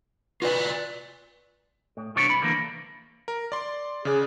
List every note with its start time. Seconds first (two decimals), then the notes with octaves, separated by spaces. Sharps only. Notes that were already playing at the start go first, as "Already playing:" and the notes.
0.42 F4 F#4 B4 D5
1.97 A2
2.16 G2 C3 B3 D4 C#5 D5
2.29 C2 B5
2.42 D3 E3 A#3
3.28 A#4
3.52 D5 C6
4.05 C#3 G#4 D5 F#6